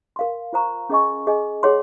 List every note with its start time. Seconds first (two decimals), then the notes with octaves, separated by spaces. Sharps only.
0.16 A#4 F5 C6
0.53 F4 C5 F5 A#5 C#6
0.90 C#4 G#4 D#5 G#5 C#6
1.27 G#4 D#5 G#5
1.63 G#4 C#5 F#5 C6